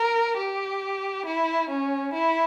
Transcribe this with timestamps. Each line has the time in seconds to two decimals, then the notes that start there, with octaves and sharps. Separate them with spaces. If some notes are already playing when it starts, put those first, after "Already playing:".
Already playing: A#4
0.38 G4
1.26 E4
1.69 C#4
2.13 E4